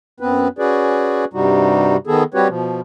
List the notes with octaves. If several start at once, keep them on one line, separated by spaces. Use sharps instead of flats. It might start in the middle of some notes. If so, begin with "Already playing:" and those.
F#2 B3 C4 B4
C#4 F#4 G#4 B4 D5
G2 C3 G3 D#4 F#4
D#3 B3 G#4 A4
G3 C4 F#4 G4 B4 C#5
B2 F3